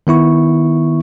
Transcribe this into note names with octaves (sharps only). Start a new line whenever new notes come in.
D#3 B3 E4 C#6